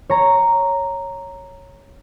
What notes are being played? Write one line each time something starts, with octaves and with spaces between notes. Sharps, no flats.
C#5 A#5